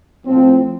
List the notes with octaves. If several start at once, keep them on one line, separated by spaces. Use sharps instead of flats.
A2 F3 C4